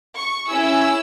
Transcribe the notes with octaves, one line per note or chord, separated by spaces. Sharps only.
C#6
C#4 E4 G#4 E6